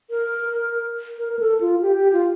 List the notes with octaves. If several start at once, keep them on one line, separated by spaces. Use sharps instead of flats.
A#4
A#4
A#4
A4
F4
G4
G4
F4